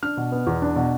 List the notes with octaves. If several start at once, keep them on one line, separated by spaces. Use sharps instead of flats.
D4 F6
B2
B3
E2
D4
B2